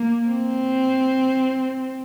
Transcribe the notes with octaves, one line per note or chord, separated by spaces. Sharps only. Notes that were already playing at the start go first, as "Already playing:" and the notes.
Already playing: A#3
C4